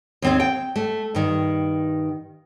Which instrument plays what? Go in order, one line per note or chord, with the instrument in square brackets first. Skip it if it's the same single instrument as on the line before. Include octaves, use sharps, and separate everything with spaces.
[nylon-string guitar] D#2 C4 C#5
G5
A3
G2 D#3